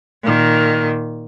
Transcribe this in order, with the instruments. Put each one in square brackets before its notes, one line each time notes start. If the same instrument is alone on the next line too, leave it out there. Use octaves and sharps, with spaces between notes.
[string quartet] A#2 D#3